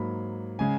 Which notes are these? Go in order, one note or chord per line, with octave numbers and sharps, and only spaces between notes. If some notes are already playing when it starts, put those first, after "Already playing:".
Already playing: G#2 F#3 A#3 B5
C#3 G#3 G#5